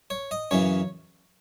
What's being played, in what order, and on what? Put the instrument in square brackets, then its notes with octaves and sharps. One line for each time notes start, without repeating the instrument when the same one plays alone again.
[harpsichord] C#5
D#5
F#2 C#3 E3 C#5